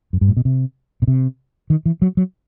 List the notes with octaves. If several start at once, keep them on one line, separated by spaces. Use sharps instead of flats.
F#2
G2
A2
B2
C3
B2
C3
D#3
E3
F#3
F#3